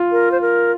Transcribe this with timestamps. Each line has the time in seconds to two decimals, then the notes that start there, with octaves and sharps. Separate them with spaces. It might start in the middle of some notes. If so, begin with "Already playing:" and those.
Already playing: F4
0.12 A#4
0.32 C5
0.41 A#4